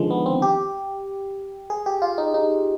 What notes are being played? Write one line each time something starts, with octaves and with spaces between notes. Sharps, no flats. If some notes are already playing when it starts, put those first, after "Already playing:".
Already playing: D3 D#3 F3 G#3
B3
C4
G4
G#4
G4
F4
D#4
D#4